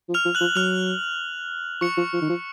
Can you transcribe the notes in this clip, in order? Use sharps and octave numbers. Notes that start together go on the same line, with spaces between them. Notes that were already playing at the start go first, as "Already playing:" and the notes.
F3
F6 F7
F3
F#6 F#7
F3
F#3 F6 F7
F3 C#6 C#7
F3
F3
D#3
F3